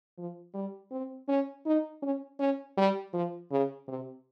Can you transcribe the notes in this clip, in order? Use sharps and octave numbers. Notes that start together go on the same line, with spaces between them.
F3
G3
C4
C#4
D#4
C#4
C#4
G3
F3
C#3
C3